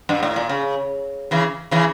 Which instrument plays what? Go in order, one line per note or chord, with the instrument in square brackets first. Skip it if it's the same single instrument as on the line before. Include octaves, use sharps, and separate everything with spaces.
[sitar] G2
A2
A#2
C#3
C#3 E3
C#3 E3